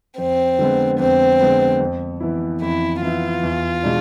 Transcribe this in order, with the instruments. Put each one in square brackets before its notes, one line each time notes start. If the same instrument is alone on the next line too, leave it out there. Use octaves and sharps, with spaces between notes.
[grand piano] F2 [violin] C4
[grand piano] D3 G#3 B3
[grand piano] F2 [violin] C4
[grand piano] D3 G#3 B3
F2
E3 B3 E4
[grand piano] F2 [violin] E4
[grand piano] E3 B3 E4 [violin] F4
[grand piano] E2
B2 G#3 D4